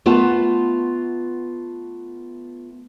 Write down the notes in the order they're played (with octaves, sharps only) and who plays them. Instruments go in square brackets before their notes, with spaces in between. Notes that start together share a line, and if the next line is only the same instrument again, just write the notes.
[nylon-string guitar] A3 B3 F4 B4 F#5 A5